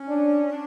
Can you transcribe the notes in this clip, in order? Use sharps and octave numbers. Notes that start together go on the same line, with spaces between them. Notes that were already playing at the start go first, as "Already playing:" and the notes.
Already playing: C#4
D4
D4